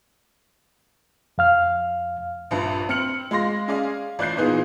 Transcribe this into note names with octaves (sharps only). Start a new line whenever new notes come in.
F2 F5 F6
A#1 G2
C4 F6 C#7 F#7
G#3 F5 C6 A#6
C#4 G#4 D5 F5
A1 D5 F#6 G6 C7
A#2 E3 B3 D#4 F4 G#4